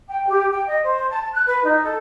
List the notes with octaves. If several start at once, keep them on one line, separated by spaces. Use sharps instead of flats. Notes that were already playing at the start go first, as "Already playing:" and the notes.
G5
G4
G5
D#5
C5
A5
F#6
B4
D#4
A4